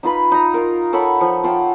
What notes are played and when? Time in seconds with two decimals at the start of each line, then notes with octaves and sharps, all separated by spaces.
0.03 D#4 F4 B4 B5
0.32 D#4 A#5
0.54 F4 A#4
0.93 A4 C#5 F#5 B5
1.21 F3
1.44 F4 F#5 G5 A5